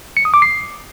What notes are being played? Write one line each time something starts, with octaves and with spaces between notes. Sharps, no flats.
C#7
D#6
D6
C7